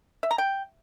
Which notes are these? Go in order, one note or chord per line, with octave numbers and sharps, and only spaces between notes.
E5
A#5
G5